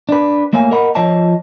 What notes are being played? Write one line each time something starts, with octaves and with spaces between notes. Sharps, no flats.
D4 B4
A3 A#3 C#5 F5 G#5
A#4 D#5 F#5 B5
F3 F4 C#5 D#5 A5